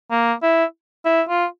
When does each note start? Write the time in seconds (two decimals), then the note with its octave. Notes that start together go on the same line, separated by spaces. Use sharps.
0.11 A#3
0.43 E4
1.05 E4
1.29 F4